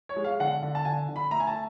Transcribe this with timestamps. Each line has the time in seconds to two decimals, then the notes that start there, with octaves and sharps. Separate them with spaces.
0.09 C#5
0.16 G#3
0.24 F5
0.40 D3 F#5
0.62 D3
0.75 A5
0.85 D3 G#5
1.08 D3
1.16 B5
1.31 A3 A#5
1.40 G#5
1.47 A5